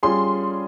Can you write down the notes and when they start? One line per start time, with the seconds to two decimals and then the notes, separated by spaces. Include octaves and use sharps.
0.03 G3 C#4 F4 G#4 C6